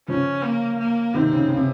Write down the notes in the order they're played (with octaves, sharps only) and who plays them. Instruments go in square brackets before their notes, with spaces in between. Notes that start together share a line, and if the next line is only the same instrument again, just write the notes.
[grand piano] C#3 F3 [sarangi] C#4
[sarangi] A#3
A#3
[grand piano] C3 D#3 [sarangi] C4
[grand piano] C#3
C#3
C3